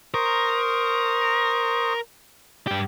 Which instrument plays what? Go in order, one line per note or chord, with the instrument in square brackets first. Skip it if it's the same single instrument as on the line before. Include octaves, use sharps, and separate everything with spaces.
[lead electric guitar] A#4 [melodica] C5 C#6 D#6
[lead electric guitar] G2 G4